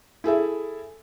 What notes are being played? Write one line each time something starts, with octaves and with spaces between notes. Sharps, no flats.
E4 G#4 A4 E5